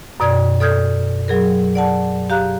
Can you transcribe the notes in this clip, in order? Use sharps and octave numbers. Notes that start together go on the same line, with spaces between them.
F#2 B2 D5 G#6
A4 D5 D#6 F6 G6 G#6
F#3 G#4 A#4
D5 F#5 A5
G4 F5 A#5 F#6